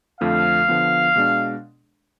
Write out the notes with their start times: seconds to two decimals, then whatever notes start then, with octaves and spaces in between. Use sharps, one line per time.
0.20 F2 D3 F3 A3 F5
0.68 D3 F3 B3
1.16 B2 G#3 D4